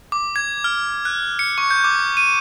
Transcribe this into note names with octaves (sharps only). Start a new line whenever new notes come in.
D6
G#6
F6
F#6
C#7
C#6
G6
D6
D#7